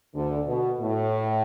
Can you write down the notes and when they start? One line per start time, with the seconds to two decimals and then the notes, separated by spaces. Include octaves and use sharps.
0.14 D2 D3
0.47 B2
0.81 A2